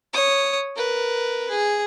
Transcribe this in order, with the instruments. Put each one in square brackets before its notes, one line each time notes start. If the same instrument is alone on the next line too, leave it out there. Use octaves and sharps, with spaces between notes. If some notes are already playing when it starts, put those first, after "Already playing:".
[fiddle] C#5 D#6
A#4 B4
G#4